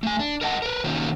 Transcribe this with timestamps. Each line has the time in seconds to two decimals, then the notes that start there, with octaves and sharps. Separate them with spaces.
0.03 A3 G#5
0.19 D4
0.41 A#4 D#5 F#5 A5
0.62 A#4 B4
0.84 D#3 A#3 C#4 D#4 F#4 C5